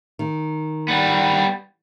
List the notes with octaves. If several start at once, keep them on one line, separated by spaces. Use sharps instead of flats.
D#3
G3 B3